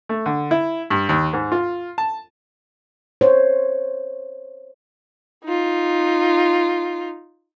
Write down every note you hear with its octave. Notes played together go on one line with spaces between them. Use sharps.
A3
D3
E4
G2
D#2
G#2
F4
A5
C5 C#5
D#4 F4